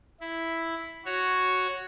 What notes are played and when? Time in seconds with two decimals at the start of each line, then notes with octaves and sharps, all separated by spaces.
0.21 E4
1.05 F#4 C#5